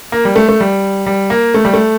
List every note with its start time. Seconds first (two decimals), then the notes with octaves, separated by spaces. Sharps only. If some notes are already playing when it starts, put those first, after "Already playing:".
0.12 A#3
0.25 G3
0.36 A3
0.49 A3
0.60 G3
1.06 G3
1.30 A#3
1.54 A3
1.65 G3
1.74 A3